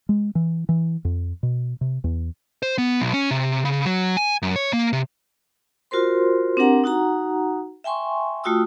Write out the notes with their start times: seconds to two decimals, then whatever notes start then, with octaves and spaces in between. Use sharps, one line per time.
0.09 G#3
0.35 E3
0.69 E3
1.05 F2
1.43 B2
1.81 C3
2.04 E2
2.63 C5
2.78 B3
3.00 B1
3.14 C#4
3.31 C3
3.65 C#3
3.85 F#3
4.17 G#5
4.42 F#2
4.56 C#5
4.73 A#3
4.93 C3
5.91 F4 F#4 A#4 C5 C6
6.57 C4 D4 G4 A#4 F#5 A#5
6.84 D#4 F#4 F#5 A#5
7.84 E5 G5 G#5 C6 C#6
8.44 A3 F4 F#4 G5 D#6 E6